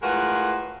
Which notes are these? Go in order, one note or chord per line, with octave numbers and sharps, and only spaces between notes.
A2 G#3 F4 F#4 A#4 B4